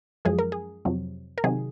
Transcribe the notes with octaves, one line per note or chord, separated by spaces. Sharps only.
F#2 F3 G#3 G#4
A#4
G#4
F2 C3 F#3
A#4
C3 D#3 F#3 G#4